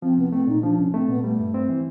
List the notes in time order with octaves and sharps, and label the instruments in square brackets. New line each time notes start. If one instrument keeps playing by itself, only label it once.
[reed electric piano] F3 [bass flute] C4
[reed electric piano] C2 [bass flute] B3
[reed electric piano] A3 [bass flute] C4
[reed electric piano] A#2 [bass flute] D#4
[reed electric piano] F3 [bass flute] D4
[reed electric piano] C2 [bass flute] C#4
[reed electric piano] A3 [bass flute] C4
[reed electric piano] A#2 [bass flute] B3
[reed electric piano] G3 [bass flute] A3
[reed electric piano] G2
C4
E3